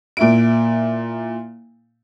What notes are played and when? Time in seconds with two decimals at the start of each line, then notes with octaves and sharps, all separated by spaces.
0.17 A#2 E4 D7